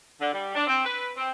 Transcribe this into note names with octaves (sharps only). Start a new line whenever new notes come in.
D3
G3
D4
C4
B4
C4